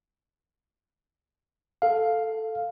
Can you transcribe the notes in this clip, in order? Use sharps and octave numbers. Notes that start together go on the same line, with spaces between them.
A4 F5